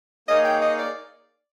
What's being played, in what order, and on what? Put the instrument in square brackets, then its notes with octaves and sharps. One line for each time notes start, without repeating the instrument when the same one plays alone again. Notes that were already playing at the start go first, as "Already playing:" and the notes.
[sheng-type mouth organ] A#3 D#4 G#4 C#5 F5 [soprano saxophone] D#5
[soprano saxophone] G5
D#5
D5